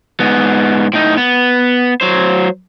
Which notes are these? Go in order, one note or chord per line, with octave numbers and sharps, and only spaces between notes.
G#2 B3
A2 D#4
B3
F#3 C5